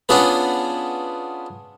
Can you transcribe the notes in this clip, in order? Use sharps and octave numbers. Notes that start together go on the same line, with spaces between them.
B3 C#4 D4 F4 G#4 B4